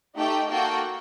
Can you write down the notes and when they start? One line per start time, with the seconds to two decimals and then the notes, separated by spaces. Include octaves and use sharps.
0.17 A3 D#4 G4 G5
0.49 A#3 F#4 A4 G5